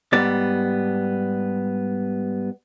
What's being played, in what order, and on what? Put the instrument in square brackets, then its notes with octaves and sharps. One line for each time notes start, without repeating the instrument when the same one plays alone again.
[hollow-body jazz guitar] G#2 G3 B3 D5